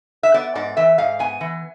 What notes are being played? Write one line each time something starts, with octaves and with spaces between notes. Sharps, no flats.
E5
B3 D5
G#2 D5
E3 E5
G#2 F5
B3 G#5
E3